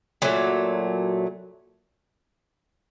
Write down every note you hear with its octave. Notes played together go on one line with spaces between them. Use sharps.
A#2 F#3 A3